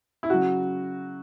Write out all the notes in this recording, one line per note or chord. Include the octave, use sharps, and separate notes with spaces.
E4
C#3 F#3 F#4